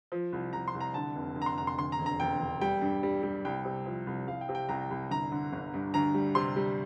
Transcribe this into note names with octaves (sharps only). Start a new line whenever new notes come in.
F3
C2
C2 A#5
C6
C2
A#5
D3 A5
F1
D3
A#5
C6
F1 A#5
C6
D2 C6
A#5
E1
A#5
E1 G5
E1
G3 G5
G2
G3
G3
C2 G5
C3
F3
C2
C2 F5
G5
C3
G5
C2 A#5
C2
G1 A#5
D3
G1
G2
D2 A#5
G3
C3 C6
G3